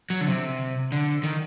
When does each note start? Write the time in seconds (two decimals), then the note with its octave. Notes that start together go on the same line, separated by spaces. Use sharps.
0.10 F#3
0.21 D3
0.27 C3
0.92 D3
1.24 D#3